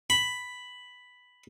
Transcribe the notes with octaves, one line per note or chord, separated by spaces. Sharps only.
B5